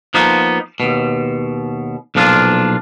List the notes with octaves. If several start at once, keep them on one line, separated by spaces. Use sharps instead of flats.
F3 A#3 B3 D#4
D#2 B2
B1 A#2 F3 D4 F4